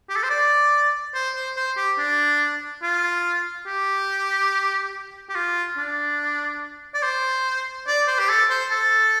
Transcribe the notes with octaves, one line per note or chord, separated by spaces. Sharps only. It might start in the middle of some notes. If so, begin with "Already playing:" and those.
G4
A4
C5
D5
C5
C5
C5
G4
D4
F4
G4
G4
F4
D4
D5
C5
D5
C5
G4
A4
C5
A4